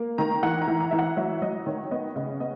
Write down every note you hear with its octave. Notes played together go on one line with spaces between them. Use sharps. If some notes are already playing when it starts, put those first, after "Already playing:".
Already playing: A#3
D#3 A#5
E3 F#5
A#5
E3
A#5
E3 E5
F#5
F#3 E5
F#3 D#5
D#3 C#5
B3 D#5
C#3 D#5
B3 D#5